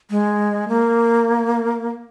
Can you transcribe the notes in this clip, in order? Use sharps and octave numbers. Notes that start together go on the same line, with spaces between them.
G#3
A#3